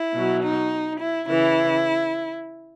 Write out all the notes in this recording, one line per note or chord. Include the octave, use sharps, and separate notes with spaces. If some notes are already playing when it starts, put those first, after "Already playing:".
Already playing: E4
B2 F#3
D#4
E4
C#3 E3 E4